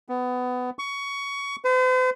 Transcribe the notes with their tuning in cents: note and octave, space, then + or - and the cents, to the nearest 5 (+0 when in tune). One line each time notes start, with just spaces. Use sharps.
B3 +20
C#6 +20
C5 -45